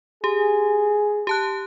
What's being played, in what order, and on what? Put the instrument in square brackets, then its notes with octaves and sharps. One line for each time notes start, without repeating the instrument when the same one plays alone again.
[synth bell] G4 [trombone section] G#4
[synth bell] G4 A5 F#6